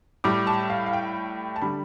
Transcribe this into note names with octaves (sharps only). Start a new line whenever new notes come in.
A2 G3 D6
A5
F5
F5
G5
A5
D3 G3 B5